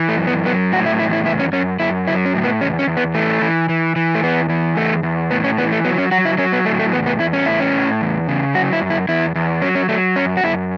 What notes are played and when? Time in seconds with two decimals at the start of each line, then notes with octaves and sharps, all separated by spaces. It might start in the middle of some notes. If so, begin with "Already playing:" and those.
Already playing: E3
0.09 A3
0.18 F#2
0.27 B3
0.45 F#3 B3
0.73 A2 F#4
0.86 E4
0.99 E2 E4
1.13 E4
1.26 E2 E4
1.39 C#4
1.53 F#2 C#4
1.80 F#2 E4
2.07 F#3 E4
2.26 C#4
2.35 A2
2.44 B3
2.61 E2 C#4
2.79 C#4
2.87 E2
2.97 B3
3.14 E3 A3
3.42 E3
3.69 E3
3.96 E3
4.15 A3
4.23 E2 B3
4.50 E3
4.77 E2 A3
5.03 E2
5.31 A2 B3
5.44 C#4
5.58 E3 B3
5.72 A3
5.85 F#3 B3
5.98 C#4
6.11 F#3 F#4
6.25 E4
6.38 F#3 C#4
6.53 B3
6.65 A2 A3
6.79 A3
6.92 E2 B3
7.06 B3
7.19 E2 E4
7.33 C#4
7.46 A2 E4
7.60 C#4
7.73 A2
8.01 E2
8.28 C#3
8.55 F#3 F#4
8.73 E4
8.82 F#2
8.90 E4
9.08 E2 E4
9.35 E2
9.62 F#3 C#4
9.75 C#4
9.89 F#3 A3
10.16 F#2 C#4
10.37 F#4
10.43 F#2 E4